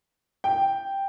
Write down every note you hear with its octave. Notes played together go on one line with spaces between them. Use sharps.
G5